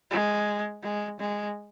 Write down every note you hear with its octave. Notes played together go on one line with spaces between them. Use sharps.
G#3
G#3
G#3